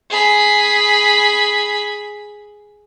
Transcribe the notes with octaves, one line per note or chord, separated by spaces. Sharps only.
G#4 B5